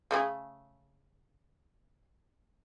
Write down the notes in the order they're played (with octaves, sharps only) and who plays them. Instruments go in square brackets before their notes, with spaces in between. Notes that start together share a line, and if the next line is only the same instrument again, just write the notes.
[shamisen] C#3 A3 G#4